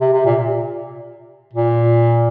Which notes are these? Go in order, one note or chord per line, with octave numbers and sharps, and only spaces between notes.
C3
C3
A#2
A#2